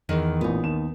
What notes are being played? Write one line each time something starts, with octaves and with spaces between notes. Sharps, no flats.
E2 D#3
A1 A#2 B3 D#4
D#2 D#3 E7